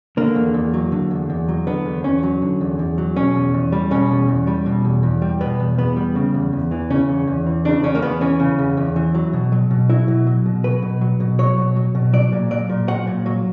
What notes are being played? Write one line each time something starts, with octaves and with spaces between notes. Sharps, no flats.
D3 A#3
E2
E2
F#3
D3
E2
E2
F#3
D3 B3
E2
E2 C#4
F#3
D3
E2
E2
F#3
B2 C#4
E2
E2
G3
B2 C#4
E2
E2
G3
B2
E2
E2
G3
B2 B3
E2
E2 B3
G3
C#3
E2
E2
E3
C#3 C#4
E2
E2
E3
C#3 D4
E2 C#4
A#3
E2 B3
E3 C#4
C#3
E2
E2
E3
F#3
B2
F#3
B2
F#3 E4
B2
F#3
B2
F#3 B4
B2
F#3
B2
F#3 C#5
B2
F#3
B2
F#3 D5
A#2
F#3 D5
A#2
F#3 F#5
A#2
F#3